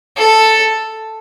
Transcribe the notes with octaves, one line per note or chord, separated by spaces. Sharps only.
A4